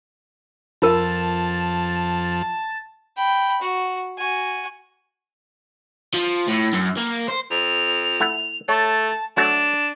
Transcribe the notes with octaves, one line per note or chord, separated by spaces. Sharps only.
F2 F3 F4 A#4 A5
G5 B5
F#4
F#4 G#5
F3
A2
F#2
A#3
C5
F2 F7
A3 E4 F#5
A3 C#5 A5
F#3 A3 D4 F#4 E7